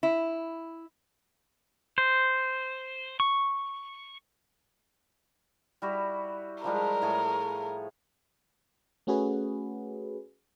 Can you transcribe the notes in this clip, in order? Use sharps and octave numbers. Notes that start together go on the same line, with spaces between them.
E4
C5
C#6
G3 E4 F#4
F3 G3 G#3 A#4
A2 G#4 C#5
A3 C#4 F#4 G#4 B4